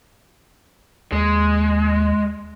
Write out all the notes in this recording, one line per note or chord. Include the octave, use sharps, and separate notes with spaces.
D#2 G#3